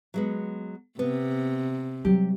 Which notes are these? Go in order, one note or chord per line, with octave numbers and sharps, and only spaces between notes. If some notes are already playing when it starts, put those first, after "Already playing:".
F#3 G#3 B3
C3 B3
F#3 G3 G4